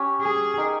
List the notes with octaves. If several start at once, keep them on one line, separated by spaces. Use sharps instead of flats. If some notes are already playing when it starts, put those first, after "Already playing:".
Already playing: C#4 G4 C#5
G#4
D#4 G4 A#4